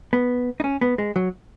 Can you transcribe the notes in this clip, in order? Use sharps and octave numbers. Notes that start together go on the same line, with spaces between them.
B3
D#4
C#4
B3
G#3
F#3